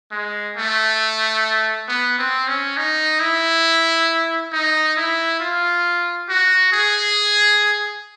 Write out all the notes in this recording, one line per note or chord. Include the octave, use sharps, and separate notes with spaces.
G#3
A3
B3
C4
C#4
D#4
E4
D#4
E4
F4
F#4
G#4